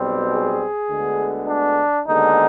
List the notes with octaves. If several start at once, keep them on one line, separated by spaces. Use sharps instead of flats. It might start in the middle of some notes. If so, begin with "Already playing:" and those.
Already playing: B1 B2 G3 C4
G#4
D2 D3 G#3 B3
D4
D#2 D3 G#3 B3 D#4